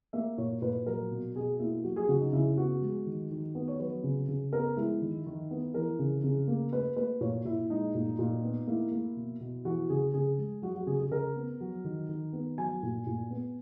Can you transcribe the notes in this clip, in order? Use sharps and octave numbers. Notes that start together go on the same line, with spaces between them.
A#3 E5
A#2 C#5
A#2 B4
F#3 A#4
B2
B2 G#4
A#3 E4
F#3 F#4
G#4
C#3 F#4
D#4
C#3 E4
B3 F#4
G#3
D#3
D#3
B3
C#5
F#3 B4
C#3
C#3
B3 A#4
G#3 E4
D#3
D#3
B3
E3 A#4
C#3
C#3
A#3
A#3 B4
A#3 B4
A#2 C#5
A#2 E4
G#3 D#4
A#2
A#2
B3
A#3 E4
A#3
B2
B2
E3 F#4
C#3 G#4
C#3 G#4
G#3
F#3 F#4
F#4
C#3 G#4
G#4
C#3 A#4
B3
F#3
D#3
D#3
B3
F#3 G#5
A#2
A#2
B3